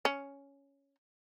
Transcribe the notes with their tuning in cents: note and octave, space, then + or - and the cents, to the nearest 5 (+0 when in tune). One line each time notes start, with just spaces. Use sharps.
C#4 +5